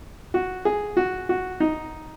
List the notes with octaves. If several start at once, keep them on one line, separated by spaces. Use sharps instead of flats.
F#4
G#4
F#4
F#4
D#4